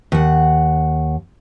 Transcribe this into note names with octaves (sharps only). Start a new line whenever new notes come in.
D#2 F#5